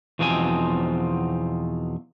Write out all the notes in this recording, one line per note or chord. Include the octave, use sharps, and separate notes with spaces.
E2 B2 F3 C4 D#4 G#5